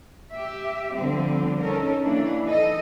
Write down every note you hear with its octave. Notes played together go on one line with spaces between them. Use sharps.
G4 E5
D3 F3 G3 C4
C#4 D#4 A4 A#4
E3 A#3 D4
D#4 A4 D#5